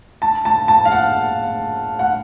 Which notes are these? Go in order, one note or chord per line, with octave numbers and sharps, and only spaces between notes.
A5
A5
A5
F5
F#5
F#5